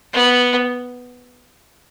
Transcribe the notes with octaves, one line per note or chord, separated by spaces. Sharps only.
B3